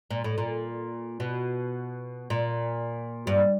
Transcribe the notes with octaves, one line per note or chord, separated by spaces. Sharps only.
A#2
A2
A#2
B2
A#2
G2